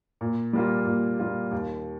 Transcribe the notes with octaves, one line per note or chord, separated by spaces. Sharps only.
A#2
G3 A#3 F4
A#2
G3 A#3 F4
D#2